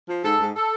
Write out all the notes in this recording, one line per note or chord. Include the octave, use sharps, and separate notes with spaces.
F3
G#2 A4
G#2
A4